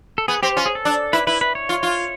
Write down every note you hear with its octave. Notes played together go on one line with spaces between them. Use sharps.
A4
B3 G#4
C4 G4
C#4 F4
G#4
A4
D4
E4 B4
E4 B4
B4
C#5
F4
F4